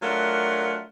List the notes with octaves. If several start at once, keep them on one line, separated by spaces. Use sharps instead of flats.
F#3 A3 D4 F4 A#4 F#5